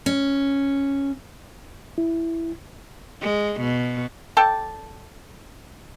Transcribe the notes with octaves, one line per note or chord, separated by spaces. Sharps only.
C#4
E4
G#3
B2
A4 D5 G5 A5